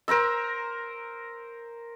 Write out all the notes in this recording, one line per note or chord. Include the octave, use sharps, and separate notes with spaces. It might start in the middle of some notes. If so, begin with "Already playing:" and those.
A#4 C5 A#5 E6